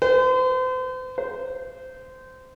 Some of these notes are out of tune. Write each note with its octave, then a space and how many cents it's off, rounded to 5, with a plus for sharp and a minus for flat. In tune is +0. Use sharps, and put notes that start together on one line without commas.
C5 -40
C5 -20